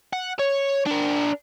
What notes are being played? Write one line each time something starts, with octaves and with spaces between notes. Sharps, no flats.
F#5
C#5
D4 A#4